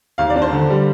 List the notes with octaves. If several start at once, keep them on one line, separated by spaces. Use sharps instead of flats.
D#2 F5
D5
D4
C5
D3
G3